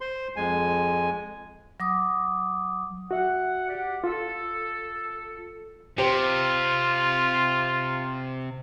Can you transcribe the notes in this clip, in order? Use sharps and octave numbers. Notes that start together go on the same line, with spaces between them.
C5 C6
F2 G#3 G#5
F#3 D6 D#6
F#4 E5 F#5
G4 D5 F#5
F4 A4
C3 F4 G4 C5